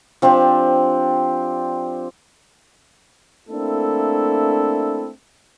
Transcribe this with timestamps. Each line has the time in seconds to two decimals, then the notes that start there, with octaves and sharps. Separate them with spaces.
0.22 F3 C4 D4 G4
3.48 A3 A#3 C4 D4 E4 A4